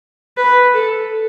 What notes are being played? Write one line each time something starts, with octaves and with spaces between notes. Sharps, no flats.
B4
A4